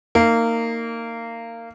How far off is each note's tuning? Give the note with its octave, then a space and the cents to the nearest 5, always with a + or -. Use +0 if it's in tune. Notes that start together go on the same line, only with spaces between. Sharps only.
A#3 -20 D#4 +0